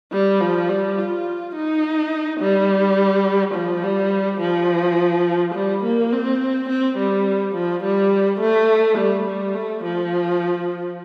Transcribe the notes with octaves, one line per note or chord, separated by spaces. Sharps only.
G3
F3
G3
F4
D#4
G3
F3
G3
F3
G3
A#3
C4
C4
G3
F3
G3
A3
G3
G3
A3
F3